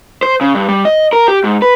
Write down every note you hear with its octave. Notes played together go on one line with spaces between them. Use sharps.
C5
C#3
G2
G3
D#5
A#4
G4
G#2
B4